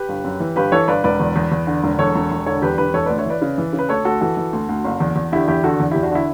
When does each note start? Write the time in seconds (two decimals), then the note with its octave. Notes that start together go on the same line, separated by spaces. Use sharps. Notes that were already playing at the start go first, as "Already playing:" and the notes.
Already playing: G4 B4
0.09 G1
0.24 F#2
0.40 E3
0.56 G1 G4 B4
0.72 E3 A4 C#5
0.88 G1 B4 D5
1.04 E1 B4 D5
1.20 E2
1.36 E2
1.52 E2
1.67 D3
1.84 E1
1.99 E2 A4 C#5
2.15 E1
2.31 E1
2.46 D3 A4 C#5
2.62 E2 G4 B4
2.78 E1 G4 B4
2.94 E3 A4 C#5
3.06 D2 B4 D5
3.18 C#5 E5
3.26 E3 B4 D5
3.42 C#3
3.58 E3
3.73 C#3
3.79 B4
3.89 D2 A4 C#5
4.05 D2 F#4 A4
4.21 E3 F#4 A4
4.37 E3
4.53 D2
4.69 D2
4.84 F#1
5.00 E2
5.16 E2
5.32 D3 E4 G4
5.47 E2 E4 G4
5.64 D3 F#4 A4
5.80 E2
5.91 E2 E4 G4
6.03 D4 F#4
6.12 D3 E4